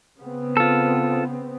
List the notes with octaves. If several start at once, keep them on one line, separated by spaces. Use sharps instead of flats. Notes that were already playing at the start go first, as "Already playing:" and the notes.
C#3 B3 C4
F4 A4